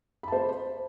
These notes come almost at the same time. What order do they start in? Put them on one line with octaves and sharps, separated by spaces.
B5 A5 C5